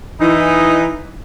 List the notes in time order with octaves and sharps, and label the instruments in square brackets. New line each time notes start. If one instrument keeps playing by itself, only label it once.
[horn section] E3 D#4